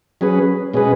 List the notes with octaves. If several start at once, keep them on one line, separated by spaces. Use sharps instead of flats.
F#3 C#4 G#4 B4
B2 G#3 C#4 G#4 B4